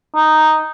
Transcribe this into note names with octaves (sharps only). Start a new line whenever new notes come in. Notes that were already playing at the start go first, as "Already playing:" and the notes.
D#4